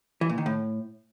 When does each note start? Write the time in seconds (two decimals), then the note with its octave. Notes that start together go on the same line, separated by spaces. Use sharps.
0.21 E3
0.29 A#2
0.38 D#3
0.46 A2